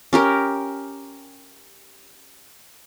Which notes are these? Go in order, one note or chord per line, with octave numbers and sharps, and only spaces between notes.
C#4 G4 A#4